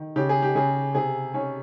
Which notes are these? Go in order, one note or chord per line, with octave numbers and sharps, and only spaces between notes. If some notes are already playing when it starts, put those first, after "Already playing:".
Already playing: D#3
C#3 G4
G#4
G4
C#3 G#4
C3 G#4
C#4